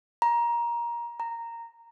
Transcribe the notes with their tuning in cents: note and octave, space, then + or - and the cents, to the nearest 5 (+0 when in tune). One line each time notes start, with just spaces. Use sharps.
A#5 +20
A#5 -10